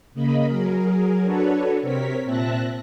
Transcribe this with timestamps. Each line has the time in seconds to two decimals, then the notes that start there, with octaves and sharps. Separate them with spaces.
0.14 C#3 A#3 D#5 B5
0.45 F#3 G#4 A#4
1.24 D4 F#4 A4 B4 C#5
1.82 C3 C4 A#4 C#5 B6
2.25 A#2 C4 E5 A5 F#6 A#6